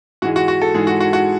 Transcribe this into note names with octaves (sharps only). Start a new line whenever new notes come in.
G#2 E3 G#3 F#4
F#4
F#4
A4
G#2 E3 G#3 G#4
F#4
F#4
F#4